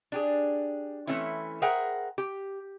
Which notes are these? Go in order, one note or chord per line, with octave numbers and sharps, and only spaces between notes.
D4 G4 G#4
E3 A3 C4 C#4 E4
G#4 A#4 C5 E5 F#5 G5
G4